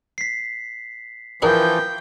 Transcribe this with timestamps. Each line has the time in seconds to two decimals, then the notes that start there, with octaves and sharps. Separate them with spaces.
0.18 B6 C7
1.42 E3 F3 D4 G#4 A#4 G5